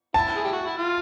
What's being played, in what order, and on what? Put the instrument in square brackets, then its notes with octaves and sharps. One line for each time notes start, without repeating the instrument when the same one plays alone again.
[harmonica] E4 [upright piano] A5
[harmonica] G#4
G4
F#4
E4
F4